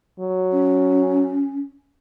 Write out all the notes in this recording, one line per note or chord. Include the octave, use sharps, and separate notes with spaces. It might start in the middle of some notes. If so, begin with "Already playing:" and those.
F#3
C#4